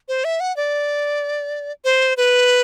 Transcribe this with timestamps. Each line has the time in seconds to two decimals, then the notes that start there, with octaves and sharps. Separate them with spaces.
0.08 C5
0.24 E5
0.40 F#5
0.57 D5
1.85 C5
2.17 B4